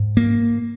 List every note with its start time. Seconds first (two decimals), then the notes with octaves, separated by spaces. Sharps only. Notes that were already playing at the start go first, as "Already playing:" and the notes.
Already playing: G#2
0.17 A#3